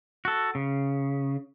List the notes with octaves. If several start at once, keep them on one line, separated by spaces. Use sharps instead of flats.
F#4 A4
C#3